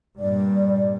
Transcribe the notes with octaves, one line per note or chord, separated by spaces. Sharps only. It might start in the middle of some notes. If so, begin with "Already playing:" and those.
G2 A#2 D5